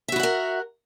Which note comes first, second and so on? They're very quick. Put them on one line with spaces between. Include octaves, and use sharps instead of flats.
E5 F#4 E4 F#5 A#4